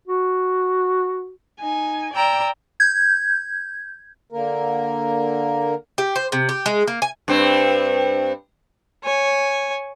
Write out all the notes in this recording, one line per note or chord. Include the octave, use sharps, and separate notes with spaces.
F#4
D#4 G#5
D5 G5 A#5 E6
G6 G#6
D3 A#3 A#4
G4
C5
C3
G4
G#3
A#3
G#5
G2 C4
C#5 G#5